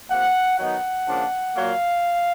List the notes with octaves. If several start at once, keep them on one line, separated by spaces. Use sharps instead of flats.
C3 F3 A#3 F#5
D#3 F#3 B3 D#4 F#5
C#3 F3 A#3 D4
A#2 F#3 A#3 F5